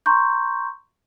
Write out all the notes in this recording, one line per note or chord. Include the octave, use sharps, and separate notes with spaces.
A#5 C6 C#6 G6